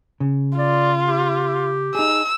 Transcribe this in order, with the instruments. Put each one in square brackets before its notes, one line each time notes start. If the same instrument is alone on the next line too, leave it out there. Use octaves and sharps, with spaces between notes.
[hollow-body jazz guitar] C#3
[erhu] F4 [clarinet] D5
[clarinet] G4
[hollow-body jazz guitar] D#4 G#4 [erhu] E6